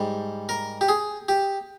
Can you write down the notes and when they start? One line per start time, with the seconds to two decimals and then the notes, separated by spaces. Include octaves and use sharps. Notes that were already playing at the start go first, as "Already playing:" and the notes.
Already playing: G#2 G3
0.49 A#4
0.81 G4
0.89 G#4
1.29 G4